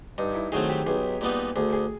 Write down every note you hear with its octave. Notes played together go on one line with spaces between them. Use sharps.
G2 D#4
E4
D#3 F#3 A3 C4 G#4
G4
B1 G#4
A#2 G3 B3 D#4
D2 G#4
G#4